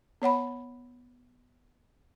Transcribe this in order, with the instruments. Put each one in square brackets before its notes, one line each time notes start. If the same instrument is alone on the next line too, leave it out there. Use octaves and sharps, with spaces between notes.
[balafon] B3 C#5 F#5 B5